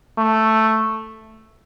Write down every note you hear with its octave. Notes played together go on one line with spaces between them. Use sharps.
A3